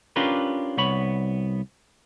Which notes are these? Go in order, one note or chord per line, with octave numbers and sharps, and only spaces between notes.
C#4 D4 F4 G4 A#4 B4
C2 B3 C#5 B5